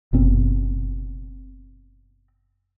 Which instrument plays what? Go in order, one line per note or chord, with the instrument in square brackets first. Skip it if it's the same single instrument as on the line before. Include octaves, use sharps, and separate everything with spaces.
[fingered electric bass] F#1 B2 C4